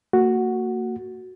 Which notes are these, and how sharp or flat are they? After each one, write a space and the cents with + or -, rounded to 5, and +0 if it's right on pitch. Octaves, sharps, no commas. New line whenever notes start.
A#3 -35 F#4 +0